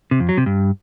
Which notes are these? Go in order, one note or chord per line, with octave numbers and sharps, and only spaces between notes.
C3
F2
F#3
C3
G2